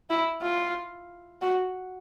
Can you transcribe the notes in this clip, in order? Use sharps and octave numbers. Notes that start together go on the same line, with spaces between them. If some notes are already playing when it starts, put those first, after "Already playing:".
E4
F4
F#4